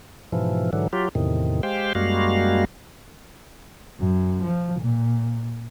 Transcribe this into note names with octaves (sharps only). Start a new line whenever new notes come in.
G#2 B2 E3 F3
G#2 D3 E3 F#3
F#3 F4 G4
E2 A2 C3 D#3
G#3 G4 C5 F5 G5
F#2 G3 G#3 A#3 F#4 F5
F#2
F3
A#2